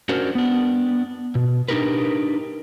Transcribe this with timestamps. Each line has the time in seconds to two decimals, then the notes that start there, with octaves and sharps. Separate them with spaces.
0.09 C#4 D4 F#4 A#4 C5
0.35 B3 D4
1.35 B2
1.68 D4 D#4 G4 A#4 B4